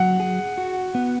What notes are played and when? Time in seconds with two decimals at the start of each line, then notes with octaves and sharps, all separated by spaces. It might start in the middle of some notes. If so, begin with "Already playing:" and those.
Already playing: F#3 F#5
0.20 G#4
0.58 F#4
0.95 B3